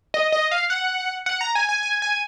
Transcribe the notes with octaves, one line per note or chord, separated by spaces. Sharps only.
D#5
D#5
F5
F#5
F#5
A#5
G#5
G#5
G#5
G#5